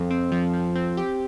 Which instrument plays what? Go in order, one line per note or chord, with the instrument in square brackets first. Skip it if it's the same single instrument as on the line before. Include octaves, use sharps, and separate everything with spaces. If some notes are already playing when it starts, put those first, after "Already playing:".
Already playing: [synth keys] F2
C4
F3
F3
C4
G4